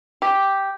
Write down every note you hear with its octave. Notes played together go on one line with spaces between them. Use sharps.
G4